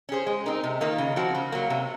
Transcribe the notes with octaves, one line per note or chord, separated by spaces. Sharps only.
C#4 G#4 C5
G#3
C4 D#4 A#4
C3
D#3 A#3 F4
C#3
F3 C4 F#4
C#3
F#3 A#3
C3